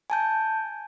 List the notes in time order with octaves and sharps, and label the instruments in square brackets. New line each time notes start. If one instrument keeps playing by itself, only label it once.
[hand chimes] G#5 A5 G6